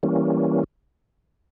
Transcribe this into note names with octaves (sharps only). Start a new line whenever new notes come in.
E3 G3 A#3 C#4